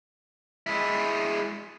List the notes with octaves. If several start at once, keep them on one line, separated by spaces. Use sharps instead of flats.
G#3 E4